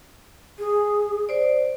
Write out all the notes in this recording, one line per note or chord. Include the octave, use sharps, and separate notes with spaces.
G#4
C5 D5